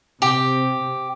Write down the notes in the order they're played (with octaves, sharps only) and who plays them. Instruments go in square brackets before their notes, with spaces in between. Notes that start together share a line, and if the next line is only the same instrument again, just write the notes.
[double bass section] C3 [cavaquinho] G4